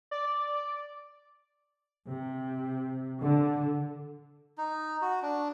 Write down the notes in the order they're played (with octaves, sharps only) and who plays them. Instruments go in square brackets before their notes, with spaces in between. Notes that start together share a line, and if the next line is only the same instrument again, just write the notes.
[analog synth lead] D5
[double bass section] C3
D3
[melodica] D#4
F#4
D4